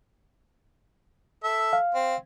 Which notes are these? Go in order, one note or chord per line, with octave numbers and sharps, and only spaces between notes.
A4 E5
F5
C4